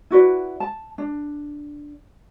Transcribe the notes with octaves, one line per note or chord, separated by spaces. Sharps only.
E4 F#4 B4 D5
A5
D4